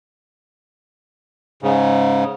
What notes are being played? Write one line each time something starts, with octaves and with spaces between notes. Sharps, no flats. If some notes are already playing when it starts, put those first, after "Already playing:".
G#2 C#3